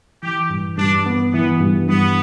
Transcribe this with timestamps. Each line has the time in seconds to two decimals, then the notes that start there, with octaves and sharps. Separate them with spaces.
0.22 E3 G4
0.50 G2
0.78 G2 D4
1.06 B3
1.33 E3 B3
1.61 G2
1.88 G2 B3